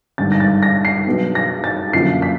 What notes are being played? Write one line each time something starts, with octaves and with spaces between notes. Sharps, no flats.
G#1 G2 D3 A6
A#6
A6
A#6
C7
B1 B2 G#3 B3 D4
A#6
A6
F#2 D3 F3 A#3 C#4 C7
B6